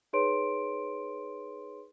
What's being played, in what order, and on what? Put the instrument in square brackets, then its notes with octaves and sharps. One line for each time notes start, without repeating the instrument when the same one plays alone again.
[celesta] D#4 G#4 B4 C#5 C6 D7